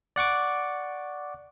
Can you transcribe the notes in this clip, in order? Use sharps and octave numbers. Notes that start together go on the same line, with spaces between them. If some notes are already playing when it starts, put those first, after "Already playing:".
D5 F#5 C#6 D6